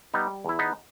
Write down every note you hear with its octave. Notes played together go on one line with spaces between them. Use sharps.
G3 B3 D#4
E2 E4
B3 D#4